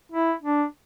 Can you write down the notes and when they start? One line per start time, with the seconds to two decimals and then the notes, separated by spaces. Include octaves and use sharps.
0.12 E4
0.43 D4